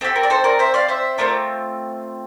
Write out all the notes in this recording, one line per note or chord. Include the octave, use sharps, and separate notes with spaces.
C4 G4 A4
A#4
D5
A4 C5
A#4 D5
C5 E5
D5 F5
C5 E5
A3 C4 F4 A#4 D5